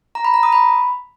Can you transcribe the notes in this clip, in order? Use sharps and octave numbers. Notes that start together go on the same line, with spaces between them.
A#5
B5
A#5
D#6
B5